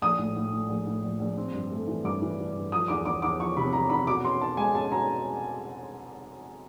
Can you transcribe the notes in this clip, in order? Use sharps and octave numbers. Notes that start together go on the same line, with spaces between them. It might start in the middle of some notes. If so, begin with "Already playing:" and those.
A#1 D#6
A2
A2
A2
A#1
A2
A#1
A#1
C4
G2
A3
E3
G2 D6
E3
E3
G2
F3 D#6
E2 D6
E2 D6
E2 D6
F3 C#6
C3 B5
E2 A#5
E2 B5
B2 D6
C#4 C6
C#4 A5
G#3 G#5
C#4 A5
B2 A#5